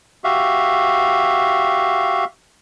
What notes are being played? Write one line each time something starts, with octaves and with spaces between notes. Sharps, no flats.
F#4 G4 E5 F5